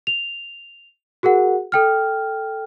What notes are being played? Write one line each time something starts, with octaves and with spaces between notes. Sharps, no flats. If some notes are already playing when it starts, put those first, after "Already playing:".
F7
F#4 G#4 A#4 F#5
A4 G5 F6